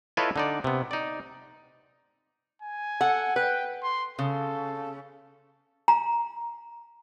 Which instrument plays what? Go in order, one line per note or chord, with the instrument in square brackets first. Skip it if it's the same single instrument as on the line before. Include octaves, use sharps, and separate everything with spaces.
[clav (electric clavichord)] E4 F4 A4 B4 C#5 D#5
D3 D#4 D5
C3 B3
D#4 D5
[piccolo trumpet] G#5
[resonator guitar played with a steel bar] A4 F#5
[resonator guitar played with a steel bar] B4 [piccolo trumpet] G5
[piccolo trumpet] C6
[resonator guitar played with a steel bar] C#3 [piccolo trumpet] A4
[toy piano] A#5